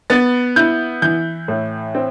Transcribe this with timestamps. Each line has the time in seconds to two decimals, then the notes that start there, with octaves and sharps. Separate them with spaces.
0.10 B3 A6
0.56 E4 G6
1.02 E3 G6
1.48 A2
1.95 C4